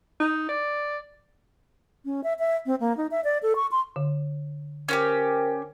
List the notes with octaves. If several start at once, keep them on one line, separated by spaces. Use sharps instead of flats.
D#4
D5
C#4
E5
E5
C4
A#3
D#4
E5
D5
A4
C#6
C6
D3
C#4 F#4 G4 A#4 C5